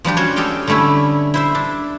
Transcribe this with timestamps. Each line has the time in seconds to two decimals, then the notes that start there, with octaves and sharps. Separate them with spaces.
0.05 F3 G3 D4 G4
0.17 C#4 F4 F#4 C5 C#5
0.36 G4 A4 D#5 F5 G5
0.68 D3 G3 A3 C#4 E4
1.34 E4 C5 E5
1.55 D4